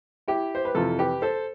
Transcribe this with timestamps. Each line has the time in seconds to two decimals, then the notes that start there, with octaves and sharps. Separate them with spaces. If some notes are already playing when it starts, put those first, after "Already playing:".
0.28 E4 G4
0.55 C5
0.65 B4
0.75 F2 C3 E3 F4 A4
0.99 G4 B4
1.22 A4 C5